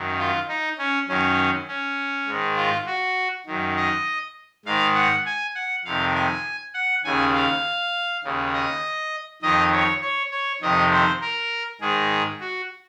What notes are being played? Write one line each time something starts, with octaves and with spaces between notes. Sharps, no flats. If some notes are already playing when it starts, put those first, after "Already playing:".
Already playing: F#2 D#3
F4
D#4
C#4
F#2 D#3 C#4
C#4
G#2 D#3
F4
F#4
F#2 D#3
D#5
G#2 D#3 F5
F#5
G#5
F#5
F2 C3 D#3 F5
G#5
F#5
D#2 C#3 G#5
F5
D#2 C#3
D#5
F2 D#3 D#5
C#5
C#5
C#5
F2 C3 D#3 D#5
C5
A#4
G#2 D#3 G#4
F#4